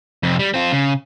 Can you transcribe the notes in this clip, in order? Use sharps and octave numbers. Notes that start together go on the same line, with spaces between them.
F2 C3
G3
C4 F4
C#3